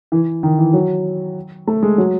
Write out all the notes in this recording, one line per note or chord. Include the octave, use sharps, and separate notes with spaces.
E3
D#3
E3
F#3
A3
G#3
F#3